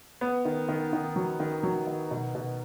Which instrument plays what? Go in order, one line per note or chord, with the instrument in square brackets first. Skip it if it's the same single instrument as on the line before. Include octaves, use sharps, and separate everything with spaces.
[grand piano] B3
D#3
D#3
D#3
F#3
D#3
F#3
D#3
B2
B2